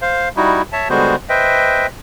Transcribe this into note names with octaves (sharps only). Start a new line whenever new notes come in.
C5 F5
G3 D#4 E4 F#4
C#5 E5 A5
D3 G3 G#3 B3 F#4 C5
B4 C5 D#5 E5 G5